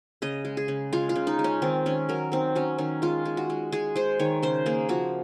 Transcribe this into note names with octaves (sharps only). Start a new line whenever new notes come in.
C#3 D#5
G#3
G#4
C#3
G#3 F4
F4
C#3
D#4
G#3
C#4
D#3 C4
D#3 C#4
F#3 A#4
D#3 C4
F#3 C#4
D#3 C#4
G#3 F4
G#3
F#4
G#3
G#3 G#4
G#3 C5
D#3 C#5
C#3 C5
A#3 G#4
F3 F#4